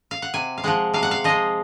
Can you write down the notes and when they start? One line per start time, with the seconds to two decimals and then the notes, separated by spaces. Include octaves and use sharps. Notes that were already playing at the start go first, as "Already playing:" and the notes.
0.11 F5
0.22 F#5
0.34 C3 G#5
0.58 F5
0.64 F3 G#3 F#5
0.94 C3 F5
1.03 F#5
1.11 F5
1.24 F3 G#3 D#5